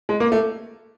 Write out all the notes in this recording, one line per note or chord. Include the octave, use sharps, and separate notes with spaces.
G#3
A#3
A3